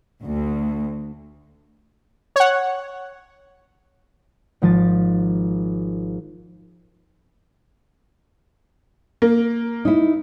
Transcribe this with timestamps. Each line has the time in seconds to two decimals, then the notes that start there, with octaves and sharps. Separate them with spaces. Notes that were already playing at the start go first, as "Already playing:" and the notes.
0.23 D2
2.36 C#5 F#5
4.62 G#1 F3 A5 A6
9.22 A#3
9.85 D#4 E4